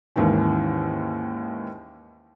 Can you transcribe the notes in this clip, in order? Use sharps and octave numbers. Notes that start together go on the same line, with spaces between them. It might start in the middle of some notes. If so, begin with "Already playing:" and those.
D#2 G#2 D#3 E3 C#4